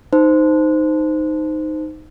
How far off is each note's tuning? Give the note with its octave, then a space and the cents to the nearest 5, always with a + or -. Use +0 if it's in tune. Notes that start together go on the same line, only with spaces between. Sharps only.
D#4 +0 C5 -15